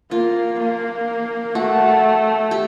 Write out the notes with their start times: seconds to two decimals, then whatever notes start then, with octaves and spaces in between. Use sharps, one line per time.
0.11 A#3 F4
0.59 A#3
1.55 A3 F#4
2.51 G4